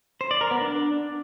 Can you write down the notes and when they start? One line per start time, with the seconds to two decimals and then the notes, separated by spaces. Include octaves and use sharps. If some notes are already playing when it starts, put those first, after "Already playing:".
0.21 C5
0.31 D5
0.41 A#4
0.51 B3
0.61 D4